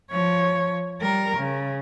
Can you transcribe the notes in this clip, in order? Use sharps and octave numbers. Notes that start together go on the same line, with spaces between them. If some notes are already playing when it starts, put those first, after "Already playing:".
F3 C#5
G3 A#4
C#3